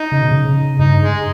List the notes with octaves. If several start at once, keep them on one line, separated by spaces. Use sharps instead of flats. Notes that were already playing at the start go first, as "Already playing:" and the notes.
Already playing: D#4
C#3
B2
C#3
C#3
G2 D#4
G#3